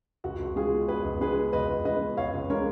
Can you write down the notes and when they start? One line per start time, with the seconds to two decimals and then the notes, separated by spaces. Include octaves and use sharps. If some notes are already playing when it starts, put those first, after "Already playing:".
0.24 C#2 F#4
0.40 C#2
0.56 G#3 F4 G#4
0.72 B2
0.88 C#2 G#4 B4
1.04 C#2
1.21 G#3 G#4 B4
1.37 B2
1.53 C#2 B4 D#5
1.69 C#2
1.85 G#3 B4 D#5
2.02 B2
2.17 C#2 C#5 F5
2.33 C#2
2.50 G#3 A#4 C#5